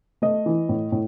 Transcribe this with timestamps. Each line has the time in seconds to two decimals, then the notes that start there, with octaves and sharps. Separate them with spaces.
0.22 A3 D#5
0.46 E3
0.69 A2
0.92 A2